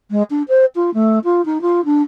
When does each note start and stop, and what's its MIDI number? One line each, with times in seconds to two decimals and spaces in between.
0.11 0.23 56
0.30 0.42 62
0.48 0.65 72
0.75 0.90 65
0.94 1.19 57
1.24 1.44 65
1.45 1.61 63
1.61 1.84 65
1.85 2.02 62